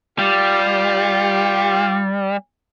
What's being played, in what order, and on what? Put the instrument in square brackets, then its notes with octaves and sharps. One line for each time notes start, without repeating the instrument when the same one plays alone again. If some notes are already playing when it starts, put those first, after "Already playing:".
[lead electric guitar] G3 [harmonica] F4 G4